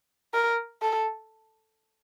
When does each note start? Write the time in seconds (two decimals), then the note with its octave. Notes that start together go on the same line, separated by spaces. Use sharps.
0.34 A#4
0.82 A4